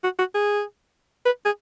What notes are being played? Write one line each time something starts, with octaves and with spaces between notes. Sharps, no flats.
F#4
F#4
G#4
B4
G#4